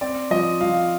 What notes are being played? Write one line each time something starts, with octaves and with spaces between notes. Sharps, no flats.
C4 D5
F3 D#5
F3 F5